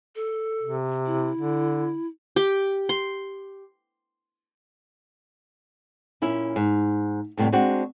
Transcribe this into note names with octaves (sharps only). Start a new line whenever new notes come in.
A4
C3
E4
D3
G4
C6
A#2 C#4 E4
G#2
F2 A2 C3 G3 B3
G#3 C4 D4 F#4